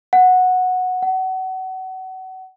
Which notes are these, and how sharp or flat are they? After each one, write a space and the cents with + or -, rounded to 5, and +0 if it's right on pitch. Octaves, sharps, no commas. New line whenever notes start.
F#5 -10
F#5 +30